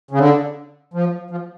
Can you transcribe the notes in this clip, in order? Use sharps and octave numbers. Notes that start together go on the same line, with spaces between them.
C#3
D3
F3
F3